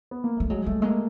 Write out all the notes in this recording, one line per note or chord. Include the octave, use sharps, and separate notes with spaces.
B3
A#3
G3 A3
F#3 G#3
G3 A3
G#3 A#3